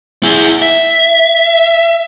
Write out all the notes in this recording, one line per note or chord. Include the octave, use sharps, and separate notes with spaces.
E4 G#4
E5